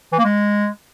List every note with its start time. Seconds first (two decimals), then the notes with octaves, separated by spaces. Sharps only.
0.12 E3
0.18 A#3
0.24 G#3